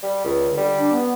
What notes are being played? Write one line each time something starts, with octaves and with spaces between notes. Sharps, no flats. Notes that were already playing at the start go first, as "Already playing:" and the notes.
G3
C#2
D3
G3
D4
B3